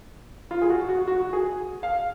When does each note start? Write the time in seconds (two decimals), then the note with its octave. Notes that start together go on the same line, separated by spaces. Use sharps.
0.51 F4
0.62 G#4
0.70 F#4
0.89 F#4
1.08 F#4
1.33 G#4
1.83 F5